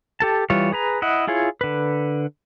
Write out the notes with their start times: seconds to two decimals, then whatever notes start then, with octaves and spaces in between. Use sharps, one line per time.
0.20 G4 A4 A5
0.50 E3 G3 F4 C#5
0.72 G#4 B4 A#5
1.02 E4 D#5 F#5
1.27 E4 F4 G#4 C#5
1.61 D3 B4